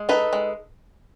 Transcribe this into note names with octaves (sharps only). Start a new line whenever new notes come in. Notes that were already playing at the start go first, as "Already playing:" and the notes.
Already playing: G#3
D#4 A4 B4
G#3